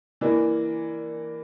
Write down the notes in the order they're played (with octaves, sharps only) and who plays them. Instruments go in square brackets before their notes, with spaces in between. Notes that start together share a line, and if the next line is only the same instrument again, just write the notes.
[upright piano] E3 A#3 D4